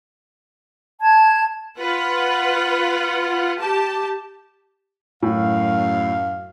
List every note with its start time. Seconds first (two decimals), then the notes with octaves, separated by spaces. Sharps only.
1.01 A5 G#6
1.79 F4 B4 F#5
3.59 G4 A5
5.23 F#2 A2 F5